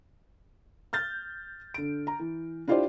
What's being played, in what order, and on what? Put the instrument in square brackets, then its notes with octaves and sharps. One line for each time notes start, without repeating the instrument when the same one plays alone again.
[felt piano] F6 G6 A6
D3 D7
A#5
E3
D4 E4 F4 G4 C5 D5